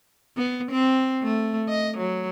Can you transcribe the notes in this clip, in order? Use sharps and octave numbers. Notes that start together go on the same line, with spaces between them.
B3
C4
A3
D#5
F#3